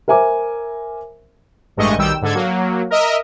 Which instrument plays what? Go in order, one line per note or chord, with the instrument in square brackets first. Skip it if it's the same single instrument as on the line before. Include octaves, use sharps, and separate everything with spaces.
[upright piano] A#4 C5 E5 G#5 A#5 D6
[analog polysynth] A1 G2 G#3 A3 D#5 C#6
B1 D#3 G3 G5 E6
G#2 D3 A4 G#6
F#3 A#3
A#4 D#5 E5